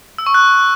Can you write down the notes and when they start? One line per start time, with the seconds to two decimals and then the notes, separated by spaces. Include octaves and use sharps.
0.18 E6
0.26 C#6
0.34 F#6